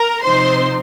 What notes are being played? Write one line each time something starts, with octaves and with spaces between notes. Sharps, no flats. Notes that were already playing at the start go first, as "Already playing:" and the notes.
Already playing: A#4 A#5
C3 F3 C4 D#4 C5 C6